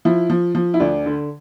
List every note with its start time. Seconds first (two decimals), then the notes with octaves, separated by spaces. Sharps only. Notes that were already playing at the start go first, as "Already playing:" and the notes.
0.05 F3 E4
0.30 F3
0.55 F3
0.74 E4
0.80 D2 D4
1.06 D3